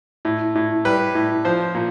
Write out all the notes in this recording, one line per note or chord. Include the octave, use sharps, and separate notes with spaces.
A2
A2
G3 B4
A2
F3 C5
A#2